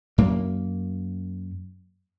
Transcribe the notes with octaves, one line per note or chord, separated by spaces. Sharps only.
F#2 A#3